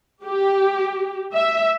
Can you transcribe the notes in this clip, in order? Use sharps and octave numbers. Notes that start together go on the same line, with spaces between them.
G4
E5